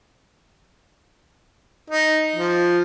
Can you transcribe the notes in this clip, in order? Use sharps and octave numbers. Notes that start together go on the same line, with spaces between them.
D#4
F3